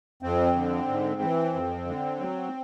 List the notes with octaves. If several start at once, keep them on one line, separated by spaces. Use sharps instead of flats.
F2 C4
D3
G#2
E3
F2
D3
F#3